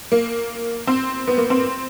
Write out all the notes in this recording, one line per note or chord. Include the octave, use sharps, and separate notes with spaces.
A#3
C4
B3
A#3
C4